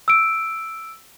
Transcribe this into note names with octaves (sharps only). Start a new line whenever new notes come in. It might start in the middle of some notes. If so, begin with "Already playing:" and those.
E6 D7